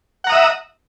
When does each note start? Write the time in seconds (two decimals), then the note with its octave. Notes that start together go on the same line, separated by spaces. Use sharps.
0.24 F#5
0.27 A#5
0.30 D#6
0.32 E5